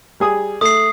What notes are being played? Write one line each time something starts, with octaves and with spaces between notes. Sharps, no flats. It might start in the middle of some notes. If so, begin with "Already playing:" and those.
G3 G#4 D#6
A3 D#6 C7